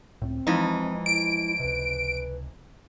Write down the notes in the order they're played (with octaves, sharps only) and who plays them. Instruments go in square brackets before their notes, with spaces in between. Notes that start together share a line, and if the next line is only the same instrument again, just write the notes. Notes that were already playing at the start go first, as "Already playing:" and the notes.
[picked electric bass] C#2 A2 [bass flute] C4
[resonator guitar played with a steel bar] F2 E3 D#4 [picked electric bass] F3 G#3
[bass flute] E4 [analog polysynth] D7
[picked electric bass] C#2 C3 [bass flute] B4